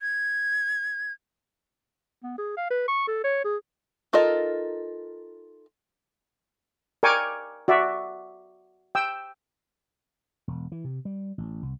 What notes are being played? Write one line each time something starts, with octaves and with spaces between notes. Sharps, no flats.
G#6
B3
G#4
F5
B4
C#6
A4
C#5
G#4
D#4 F4 A4 A#4 D#5
A#4 D5 G5 G#5 C#6 D6
F#4 D5 E5
G5 E6
E1
E3
C3
G3
A1
C2